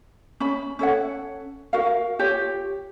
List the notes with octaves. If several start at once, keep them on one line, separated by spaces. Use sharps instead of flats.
C#4 B5
C#4 A4 C#5 F#5
F#4 A#4 F5
F4 G4 C#5